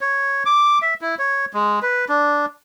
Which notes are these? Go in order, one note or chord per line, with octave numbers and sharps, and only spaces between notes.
C#5
D6
E5
E4
C#5
G#3
B4
D4